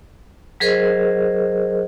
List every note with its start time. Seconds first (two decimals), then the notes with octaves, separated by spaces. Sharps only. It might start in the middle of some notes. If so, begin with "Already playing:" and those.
0.60 F#3 G#4 A#4 C5 D#5